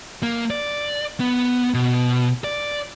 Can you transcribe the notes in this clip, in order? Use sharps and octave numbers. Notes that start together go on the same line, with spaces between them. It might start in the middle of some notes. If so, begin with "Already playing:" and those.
A#3
D5
B3
B2
D5